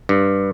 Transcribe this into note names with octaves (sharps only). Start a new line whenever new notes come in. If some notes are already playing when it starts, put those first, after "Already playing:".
G2